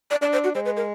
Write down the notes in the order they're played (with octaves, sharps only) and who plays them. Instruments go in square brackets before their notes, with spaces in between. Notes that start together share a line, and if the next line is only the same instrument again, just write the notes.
[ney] D5
[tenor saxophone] D4 [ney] D5
[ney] C5
F#4
[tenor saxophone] G#3 [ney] C5
[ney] B4
A#4